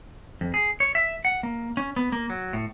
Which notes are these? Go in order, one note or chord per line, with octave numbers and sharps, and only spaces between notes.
F2
G#4
C#5
E5
F#5
A#3
C#4
B3
A#3
F#3
A2